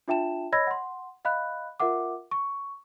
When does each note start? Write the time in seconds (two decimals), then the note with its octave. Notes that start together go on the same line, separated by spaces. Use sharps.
0.08 D4 F4 E5 G5 A5 E7
0.52 C#5 D#5 B5 E6 G#6 A#6
0.67 F#5 C6
1.25 D#5 F5 B5 F#6
1.80 F4 A#4 E5 F#5 D6
2.31 C#6